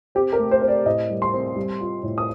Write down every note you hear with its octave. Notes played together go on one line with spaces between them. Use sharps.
C4 G4
A#4
A3
C5
C4 C5
D5
A2 D#5
G3
C6
C4
G3
F4
A2
D#6